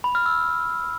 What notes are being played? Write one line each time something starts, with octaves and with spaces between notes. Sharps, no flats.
B5
F6
E6